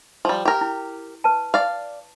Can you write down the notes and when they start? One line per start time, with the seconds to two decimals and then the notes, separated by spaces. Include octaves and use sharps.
0.25 F3 G3
0.45 G4 A#4
0.61 E4
1.24 B4 A5
1.54 D5 F5